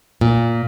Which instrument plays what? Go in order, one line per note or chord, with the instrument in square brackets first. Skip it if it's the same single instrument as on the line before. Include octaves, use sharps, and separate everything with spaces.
[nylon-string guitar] A#2